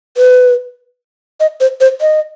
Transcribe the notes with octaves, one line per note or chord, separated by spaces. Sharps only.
B4
D#5
C5
C5
D#5